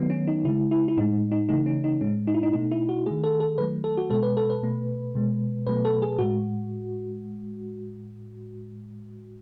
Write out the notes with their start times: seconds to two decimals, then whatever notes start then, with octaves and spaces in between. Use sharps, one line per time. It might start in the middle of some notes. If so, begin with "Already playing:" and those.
Already playing: D#3 F#3 A3 B3
0.10 C#4
0.27 D#4
0.44 C#3 G#3 E4
0.71 E4
0.88 E4
0.97 A2 G#3 D#4
1.32 D#4
1.49 C#3 E3 A3 D#4
1.66 C#4
1.84 D#4
2.01 A2 G#3 C#4
2.27 D#4
2.34 E4
2.43 D#4
2.53 B2 A3 D#4
2.71 E4
2.89 F#4
3.06 D#3 A3 G#4
3.24 A4
3.40 A4
3.58 D#3 F#3 A3 B4
3.84 A4
3.97 F#4
4.10 B2 G#3 A4
4.23 B4
4.37 A4
4.50 B4
4.63 B2 A3
5.15 B2 G#3
5.66 B2 F#3 A3 B4
5.85 A4
6.02 G#4
6.18 A2 G#3 F#4